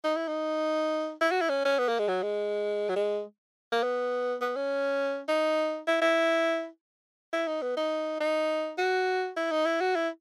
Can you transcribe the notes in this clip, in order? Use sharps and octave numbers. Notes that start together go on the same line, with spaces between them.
D#4
E4
D#4
E4
F#4
E4
C#4
C#4
B3
A#3
G#3
F#3
G#3
F#3
G#3
A#3
B3
B3
C#4
D#4
E4
E4
E4
D#4
B3
D#4
D#4
F#4
E4
D#4
E4
F#4
E4